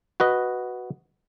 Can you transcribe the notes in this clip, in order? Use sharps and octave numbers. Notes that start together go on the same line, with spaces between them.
F#4 B4 D#5